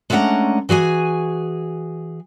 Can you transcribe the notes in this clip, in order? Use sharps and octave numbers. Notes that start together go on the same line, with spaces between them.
G#3 A3 C#4 D4 F#5 A#5
E3 F#4 G#4 G#5